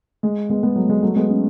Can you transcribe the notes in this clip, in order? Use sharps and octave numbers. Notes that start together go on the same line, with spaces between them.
G#3
G#3 B3
G#3 B3
F#3 A3
G#3
F#3 A3
G#3 B3
A3 C#4